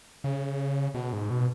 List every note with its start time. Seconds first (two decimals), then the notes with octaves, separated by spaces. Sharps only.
0.24 C#3
0.94 B2
1.13 G#2
1.30 B2